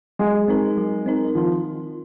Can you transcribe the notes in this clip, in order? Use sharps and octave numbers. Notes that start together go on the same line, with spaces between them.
F#3 G#3
C4 D#4 A#4
F#3
C4 D#4 A#4
D#3 F3